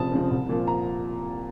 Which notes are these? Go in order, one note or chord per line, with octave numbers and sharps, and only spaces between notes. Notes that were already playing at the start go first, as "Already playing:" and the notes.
Already playing: F1 F2 C#3 F3 A5 D#6
F2 C#3 F3
C2
A#2 F3
A#5